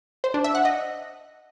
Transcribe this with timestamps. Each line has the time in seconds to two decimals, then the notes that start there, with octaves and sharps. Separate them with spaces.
0.24 C5
0.34 D4
0.44 E5
0.55 F#5
0.65 D#5